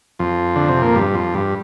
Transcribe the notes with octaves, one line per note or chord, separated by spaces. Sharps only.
F2
D3
C3
A#2
G2
F2
G2